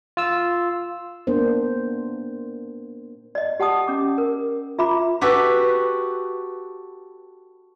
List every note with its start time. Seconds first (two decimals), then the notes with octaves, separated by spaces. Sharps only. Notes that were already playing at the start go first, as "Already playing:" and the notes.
0.17 F4 E6
1.27 A#3 B3 D4 C5
3.35 D5 D#5
3.60 G4 F#5 A5 D#6
3.88 C#4 D6
4.18 A#4
4.79 F4 E5 A#5 B5 D6
5.21 F#4 G4 A4 B4